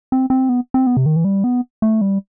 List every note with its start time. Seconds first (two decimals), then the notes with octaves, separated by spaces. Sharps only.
0.12 C4
0.30 C4
0.49 B3
0.74 C4
0.87 B3
0.97 C3
1.06 D#3
1.16 E3
1.24 G3
1.44 B3
1.82 A3
2.01 G3